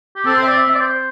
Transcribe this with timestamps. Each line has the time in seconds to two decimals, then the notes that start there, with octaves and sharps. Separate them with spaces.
0.16 G4
0.25 C4 A4
0.36 C5
0.43 E5
0.48 D5
0.58 E5
0.70 E5
0.75 D5
0.80 C5